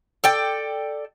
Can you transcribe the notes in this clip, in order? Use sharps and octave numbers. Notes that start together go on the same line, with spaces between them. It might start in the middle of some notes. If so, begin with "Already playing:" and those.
A4 D5 G5